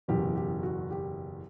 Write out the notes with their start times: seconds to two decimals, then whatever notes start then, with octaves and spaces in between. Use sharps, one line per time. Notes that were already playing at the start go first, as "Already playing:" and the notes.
0.08 F#1 E2 B2 G4
0.36 G4
0.63 F#4
0.91 G4